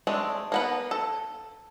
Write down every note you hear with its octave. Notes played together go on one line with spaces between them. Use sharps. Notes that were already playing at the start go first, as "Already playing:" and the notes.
G#3 A3 C4 D4
A#3 B3 B5
A4